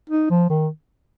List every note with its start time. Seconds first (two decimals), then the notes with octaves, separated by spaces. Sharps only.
0.10 D#4
0.30 F3
0.50 D#3